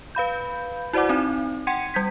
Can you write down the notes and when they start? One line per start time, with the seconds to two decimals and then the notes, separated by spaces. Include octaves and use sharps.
0.15 B4 F5 B5 G6
0.93 E4 F#4 C5 D5 F#5 D6
1.09 C4 D#4
1.67 F#5 G5 C6 G#6 C#7 D#7
1.94 G3 G6 G#6 B6